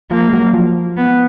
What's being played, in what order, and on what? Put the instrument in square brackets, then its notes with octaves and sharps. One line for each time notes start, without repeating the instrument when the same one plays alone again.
[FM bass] F3 [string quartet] A#3
[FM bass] G#3
F#3
F3
[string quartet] B3